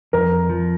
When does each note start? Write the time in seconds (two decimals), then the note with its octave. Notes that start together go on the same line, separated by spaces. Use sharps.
0.13 F2 A#4
0.49 F3